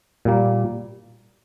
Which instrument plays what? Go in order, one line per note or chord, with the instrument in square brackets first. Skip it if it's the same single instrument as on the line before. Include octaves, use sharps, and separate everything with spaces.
[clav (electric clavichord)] A#2 G3 A#3